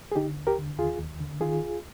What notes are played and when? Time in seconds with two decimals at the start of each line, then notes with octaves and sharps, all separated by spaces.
0.12 G#4
0.15 D3 D#4 G4
0.37 D#2
0.47 G4 A#4
0.58 D3
0.79 D#2 F4 G#4
0.99 D#2
1.20 D3
1.40 D#3 F4 G#4
1.62 C2